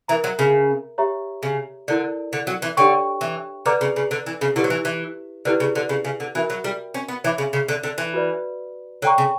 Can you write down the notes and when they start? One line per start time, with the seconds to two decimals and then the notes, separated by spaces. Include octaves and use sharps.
0.08 E3 A#4 E5 A#5
0.24 F#3
0.39 C#3
0.98 G4 C#5 E5 A#5
1.43 C#3
1.88 D3 E4 A#4 D5
2.33 D3
2.47 F#3
2.62 E3
2.77 D3 D4 G4 C#5 G5 C#6
3.21 E3
3.66 D3 B4 D5 A#5 D6
3.81 C#3
3.96 C#3
4.11 D3
4.26 E3
4.41 C#3
4.56 D3 E4 G4 B4
4.64 F#3
4.70 E3
4.85 E3
5.45 D3 E4 G4 B4 D5
5.60 C#3
5.75 D3
5.89 C#3
6.05 C#3
6.20 D3
6.35 E3 F#4 A#4 E5
6.50 F#3
6.64 G3
6.94 C#4
7.08 B3
7.24 E3 C#5 E5 B5 D6
7.38 C#3
7.53 C#3
7.68 D3
7.83 D3
7.98 E3
8.14 F#4 B4 D5
9.02 D3 C#5 G5 A#5 C#6
9.18 C#3